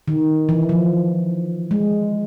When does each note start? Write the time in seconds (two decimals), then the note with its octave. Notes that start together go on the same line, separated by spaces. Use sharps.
0.08 D#3
0.49 E3
0.69 F3
1.71 G#3